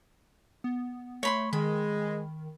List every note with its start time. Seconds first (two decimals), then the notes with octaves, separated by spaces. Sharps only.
0.64 B3
1.23 A3 C#5 B5 C6
1.53 D#3 G#3 B5